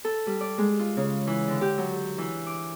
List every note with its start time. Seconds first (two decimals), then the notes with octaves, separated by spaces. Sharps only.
0.05 A4
0.27 G3
0.41 D5
0.58 G#3
0.79 F4
0.97 C#3
1.27 E3
1.48 D3
1.61 G4
1.78 F#3
2.18 E3
2.47 D6